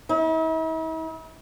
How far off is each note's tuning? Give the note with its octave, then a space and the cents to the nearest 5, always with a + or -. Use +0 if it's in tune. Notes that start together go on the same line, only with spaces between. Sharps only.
E4 -45